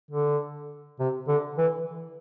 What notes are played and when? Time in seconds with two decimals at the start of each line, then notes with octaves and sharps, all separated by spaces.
0.11 D3
0.99 C3
1.28 D3
1.58 E3